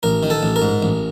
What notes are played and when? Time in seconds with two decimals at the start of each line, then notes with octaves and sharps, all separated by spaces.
0.03 A1 A#4
0.23 D#3
0.30 A4
0.43 A1
0.56 A#4
0.62 G#2
0.83 A1